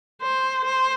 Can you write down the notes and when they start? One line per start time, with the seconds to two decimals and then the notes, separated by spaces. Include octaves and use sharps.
0.22 C5
0.65 C5